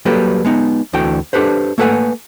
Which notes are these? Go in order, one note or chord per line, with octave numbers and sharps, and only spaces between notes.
F#3 G3 A#3 G4 A4 B4
G#3 B3 D#4
D2 D3 E3 F#4 G5
D4 G4 A4 B4 C5
A3 A#3 A4 B4 F#5 G#5